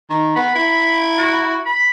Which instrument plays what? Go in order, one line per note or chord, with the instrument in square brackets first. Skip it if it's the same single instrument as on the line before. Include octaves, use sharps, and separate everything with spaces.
[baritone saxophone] D#3
[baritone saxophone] B3 [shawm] B5
[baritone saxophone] E4
[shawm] F#4
B5